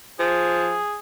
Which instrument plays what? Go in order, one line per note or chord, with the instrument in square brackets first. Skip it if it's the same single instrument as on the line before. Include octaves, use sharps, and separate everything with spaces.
[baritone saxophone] F3 [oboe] G#4